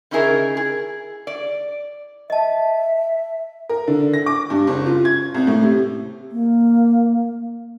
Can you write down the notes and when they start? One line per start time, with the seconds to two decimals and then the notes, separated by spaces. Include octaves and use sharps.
0.11 C#3 C#4 D#4 E4 G#4 A#4
0.57 G#4
1.27 D5
2.30 D#5 E5 A5
3.69 A#4
3.87 D3
4.14 A#6
4.26 D6
4.50 G2
4.67 F#1
4.86 F4
5.05 G#6
5.34 C2
5.47 A2
5.63 C3
6.32 A#3